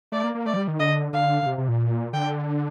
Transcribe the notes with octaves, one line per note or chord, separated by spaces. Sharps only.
A3 D5
A#3
A#3
A3 D5
F3
G3
D#3
D3 D#5
D3 F5
D3
C3
C3
A#2
D3 G5